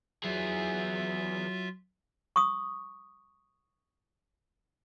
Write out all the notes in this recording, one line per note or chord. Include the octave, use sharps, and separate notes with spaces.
E3 F#3 F4 G#4 E5
C#6 D#6